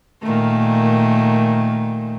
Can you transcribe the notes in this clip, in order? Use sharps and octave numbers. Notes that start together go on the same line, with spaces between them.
A#2 D#3 A3